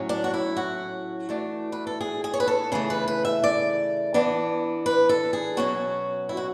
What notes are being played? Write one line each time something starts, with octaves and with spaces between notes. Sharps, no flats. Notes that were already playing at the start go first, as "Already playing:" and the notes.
Already playing: A2 F#3 C#4
D4
F#4
E4
F#4
E3 A3 D4
B4
A4
G#4
G#4
C#5
B4
A4
C#3 E3 A3 G#4
B4
B4
E5
D5
E3 B3 D4
B4
A4
G#4
B2 F#3 C#4 F#4
E4
F#4